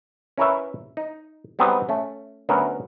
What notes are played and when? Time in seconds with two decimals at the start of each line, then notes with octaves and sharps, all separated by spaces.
0.38 C#4 E4 A#4 B4 C#5 E5
0.97 D#4
1.59 F#3 G3 B3 C4 D#4 G#4
1.89 A3 C#4
2.49 D2 F#3 B3 C#4 A#4 E5